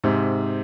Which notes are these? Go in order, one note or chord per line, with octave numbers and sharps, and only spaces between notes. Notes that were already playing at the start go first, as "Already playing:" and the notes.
G#2 C3